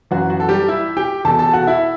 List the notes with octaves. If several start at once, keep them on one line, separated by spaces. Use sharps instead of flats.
F#2 E3 F#4
F#4
A4
G3 G4
E4 E5
G4 G5
E2 B2 A4 A5
A4 A5
F#4 F#5
E4 E5